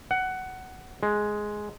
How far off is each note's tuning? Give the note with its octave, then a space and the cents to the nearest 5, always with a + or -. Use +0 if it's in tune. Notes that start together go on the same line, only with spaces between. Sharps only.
F#5 +15
G#3 +5